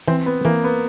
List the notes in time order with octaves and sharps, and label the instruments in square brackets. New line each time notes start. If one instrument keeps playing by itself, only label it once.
[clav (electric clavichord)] E3 [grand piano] C4
[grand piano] B3
[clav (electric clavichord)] E3 [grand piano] A#3
[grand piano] B3